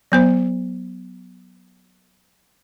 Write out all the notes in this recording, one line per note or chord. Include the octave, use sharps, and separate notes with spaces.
F#3 B3 C5